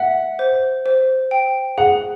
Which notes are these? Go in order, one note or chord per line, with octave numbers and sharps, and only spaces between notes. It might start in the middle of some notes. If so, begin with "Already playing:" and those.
Already playing: E5 F#5
C5
C5
G5
G#4 F#5